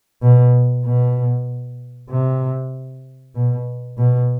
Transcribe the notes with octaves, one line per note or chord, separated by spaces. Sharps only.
B2
B2
C3
B2
B2